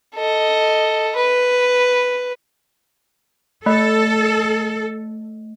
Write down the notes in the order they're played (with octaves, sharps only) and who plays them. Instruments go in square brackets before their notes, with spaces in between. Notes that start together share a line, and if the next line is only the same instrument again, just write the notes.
[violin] A4 D#5
B4
[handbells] A3 D#5 [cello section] A4